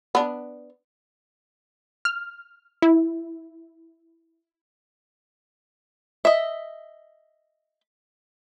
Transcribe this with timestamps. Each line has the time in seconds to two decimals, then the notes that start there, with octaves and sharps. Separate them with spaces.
0.15 B3 D4
2.05 F6
2.82 E4
6.25 D#5 E5